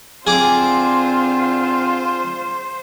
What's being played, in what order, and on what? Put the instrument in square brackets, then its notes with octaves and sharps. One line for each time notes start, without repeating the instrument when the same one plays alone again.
[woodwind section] D3 C4 [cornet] F4 [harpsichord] G#4 D6 [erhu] C5